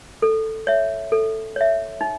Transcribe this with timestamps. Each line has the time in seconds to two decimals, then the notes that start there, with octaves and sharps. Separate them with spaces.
0.22 A4
0.67 C#5 E5
1.12 A4
1.56 C#5 E5
2.01 D#4